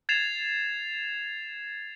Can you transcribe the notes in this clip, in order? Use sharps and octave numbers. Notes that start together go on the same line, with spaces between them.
G#6 A6 C7 E7 F7